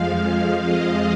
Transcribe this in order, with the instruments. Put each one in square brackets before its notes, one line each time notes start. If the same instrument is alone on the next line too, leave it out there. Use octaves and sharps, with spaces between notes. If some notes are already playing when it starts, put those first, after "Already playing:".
Already playing: [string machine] F2 F3 G#3 F5
D#5